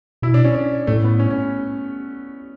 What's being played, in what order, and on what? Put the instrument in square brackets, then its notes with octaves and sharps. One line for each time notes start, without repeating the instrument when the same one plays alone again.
[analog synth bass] B2 [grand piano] E4
[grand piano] D4
C#4
D4
[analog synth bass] A2 [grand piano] A3
[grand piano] B3
C#4
C#4